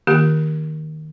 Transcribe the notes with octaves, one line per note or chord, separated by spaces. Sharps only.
D#3 A#3 G4